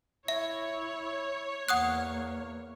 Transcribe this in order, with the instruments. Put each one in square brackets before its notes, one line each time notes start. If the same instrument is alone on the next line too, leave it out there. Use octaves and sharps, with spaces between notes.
[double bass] E4 [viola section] C#5 [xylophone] E5
[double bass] E2 A#3 [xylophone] F#5 D#6 F#6